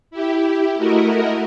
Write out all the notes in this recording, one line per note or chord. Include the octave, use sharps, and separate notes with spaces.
E4 G4
A3 E4 F#4 A#4 D#5